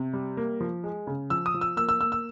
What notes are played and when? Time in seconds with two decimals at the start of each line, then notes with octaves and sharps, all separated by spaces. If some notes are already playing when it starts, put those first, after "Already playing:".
Already playing: C3
0.13 G3
0.37 A#3
0.60 F3
0.84 G#3
1.07 C#3
1.30 F3 E6
1.46 D#6
1.54 F3
1.61 E6
1.77 A#3 E6
1.89 E6
2.01 A#3 E6
2.12 E6